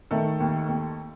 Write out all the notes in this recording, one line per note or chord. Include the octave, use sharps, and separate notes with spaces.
D#3 A3 A4
D#2
D#2